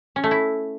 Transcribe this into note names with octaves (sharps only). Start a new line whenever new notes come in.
C#4
A3
E4